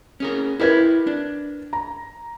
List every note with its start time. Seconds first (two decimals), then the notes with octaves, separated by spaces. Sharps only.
0.20 C#4 G#4 A#4
0.60 E4 G4 A#4 B4 E5 G#6
1.07 D4
1.73 A#5